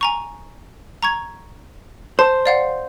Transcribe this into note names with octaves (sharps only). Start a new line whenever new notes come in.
G#5 A#5 C#6
A#5 C#6 G#6
C5 A5
D5 F5 F#5